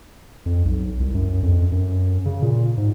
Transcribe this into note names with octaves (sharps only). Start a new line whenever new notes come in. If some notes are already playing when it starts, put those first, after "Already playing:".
F2
B1
C2
F#2
F2
F#2
C#3
A#2
G#2